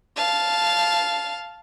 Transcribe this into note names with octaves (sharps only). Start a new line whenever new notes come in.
F5 A5